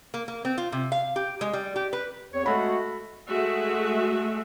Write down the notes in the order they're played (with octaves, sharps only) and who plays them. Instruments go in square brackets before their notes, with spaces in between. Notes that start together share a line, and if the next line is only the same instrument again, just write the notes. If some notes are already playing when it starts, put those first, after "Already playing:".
[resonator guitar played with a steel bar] A#3
A#3
C4
F4
C3
F5
G4
G#3
G3
G4
B4
[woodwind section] E2 C4 C#5
[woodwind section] G#3 A3 F#4 [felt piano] A4 B5
[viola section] G#3 A3 F#4 G#4 E5